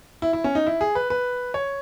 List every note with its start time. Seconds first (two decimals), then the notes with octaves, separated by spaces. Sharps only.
0.22 E4
0.33 E4
0.44 C#4
0.55 D#4
0.67 E4
0.81 G#4
0.95 B4
1.10 B4
1.54 C#5